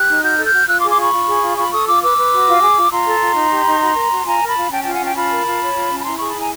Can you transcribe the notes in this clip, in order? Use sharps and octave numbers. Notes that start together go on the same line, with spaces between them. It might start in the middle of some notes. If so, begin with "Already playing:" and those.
Already playing: G4 F#6
D#4
F#4 F6 G6
A4
F6 G6
F#4
F4 E6 F#6
C6 D6
G#4
C6 D6
F4 B5 C#6
F4
G#4
F4
F4 B5 C#6
A4 C#6 D#6
F4 D6 E6
B4 D6 E6
B4
F#4
F4
G#4
F4
F4 A#5 C6
A4
F4
D#4
G4
D#4
F#4
A#4
F#4
F4 G#5 A#5
A#4
A5 B5
F4
C#4 G5 A5
F4 G5 A5
F#5 G#5
C#4 G5 A5
F4 A5 B5
A#4
F4
C#5
F4
C#4
B5
E4 A#5 C6
G#4 B5 C#6
A5 B5
E4 G#5 A#5